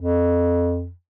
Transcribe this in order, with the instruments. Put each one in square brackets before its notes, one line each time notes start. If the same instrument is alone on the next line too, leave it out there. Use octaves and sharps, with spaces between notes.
[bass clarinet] F2